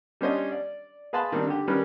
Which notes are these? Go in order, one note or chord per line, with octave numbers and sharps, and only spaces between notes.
G3 C#4 D4 C5 C#5 D#5
D5
G#4 B4 F5 A5 B5 C6
D#3 G3 A#3 C4 D4
D3 G4
D#3 G3 C#4 A#4 B4